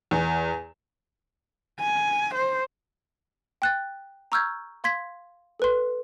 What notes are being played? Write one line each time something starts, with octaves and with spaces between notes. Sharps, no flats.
E2
G#5
C5
G5 F#6 A6
A#5 C#6 E6 F6 G6 G#6
F5 C6 G#6 B6
A4 B4 C6